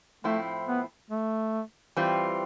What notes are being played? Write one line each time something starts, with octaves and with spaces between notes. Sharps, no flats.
A2 F3 A3 C4 E4
B3
A3
E3 G3 C4 F4